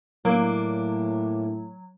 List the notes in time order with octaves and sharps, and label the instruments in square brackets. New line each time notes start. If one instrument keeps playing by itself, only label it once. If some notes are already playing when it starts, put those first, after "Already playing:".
[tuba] A2 [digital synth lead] F#3 [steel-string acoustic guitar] A#3 D4